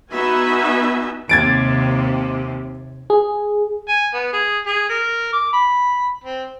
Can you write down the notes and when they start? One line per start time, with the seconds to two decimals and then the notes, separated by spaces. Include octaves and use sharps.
0.12 B3 D#4 F#4 B4 E5 G#5
1.29 D#2 C3 G#6 A6 D7
3.10 G#4
3.89 G#5
4.14 B3
4.33 G#4
4.67 G#4
4.89 A#4
5.33 D6
5.53 B5
6.24 C4